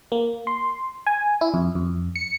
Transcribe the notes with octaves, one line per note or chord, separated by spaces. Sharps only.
A#3
C6
G#5
E4
F2
F2
C#7